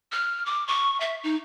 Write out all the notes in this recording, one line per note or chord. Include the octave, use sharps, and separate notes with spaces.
F6
D6
C#6
E5
D#4